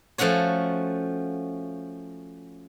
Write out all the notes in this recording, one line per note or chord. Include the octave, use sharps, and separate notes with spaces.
F3 A3 C#4 F#4 C#5